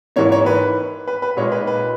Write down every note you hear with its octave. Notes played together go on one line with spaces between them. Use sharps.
G#2 E3 A#3 C#5
C#5
B4
B4
B4
A#2 G#3 D#4 C#5
B4
B4